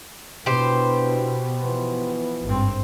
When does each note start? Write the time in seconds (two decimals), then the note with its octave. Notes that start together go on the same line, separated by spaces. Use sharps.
0.46 B2 D4 E4 G4 B4 C5
1.62 E3 F3 B3
2.45 G#1 G2 C4